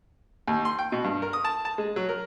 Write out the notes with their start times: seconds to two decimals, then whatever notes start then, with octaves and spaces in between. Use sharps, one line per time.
0.48 D#2
0.65 C6
0.79 G5
0.92 B2
1.04 G2
1.22 A#4
1.33 D#6
1.44 A5
1.65 A5
1.78 G#3
1.96 F#3
2.09 A#4